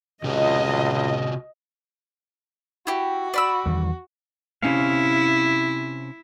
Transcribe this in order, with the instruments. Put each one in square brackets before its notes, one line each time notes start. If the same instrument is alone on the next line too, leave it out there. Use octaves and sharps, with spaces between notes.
[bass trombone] C#2 [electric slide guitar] C3 F4 F#4 [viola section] D#5
[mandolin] E4 G4 [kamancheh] F#4
[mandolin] D5 B5 E6
[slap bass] E2 D#3 G3
[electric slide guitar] C3 C#4 F5 [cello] E4